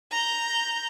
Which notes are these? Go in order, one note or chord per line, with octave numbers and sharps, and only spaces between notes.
A#5 G6